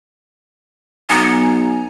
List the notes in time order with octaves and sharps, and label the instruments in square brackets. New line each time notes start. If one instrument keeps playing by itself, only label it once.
[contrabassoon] B1 [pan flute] B3 [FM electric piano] G#5 A#5